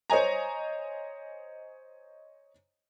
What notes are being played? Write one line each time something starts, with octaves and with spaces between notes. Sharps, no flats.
C5 C#5 D#5 G#5 A#5